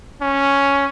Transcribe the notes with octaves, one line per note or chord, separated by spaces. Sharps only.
C#4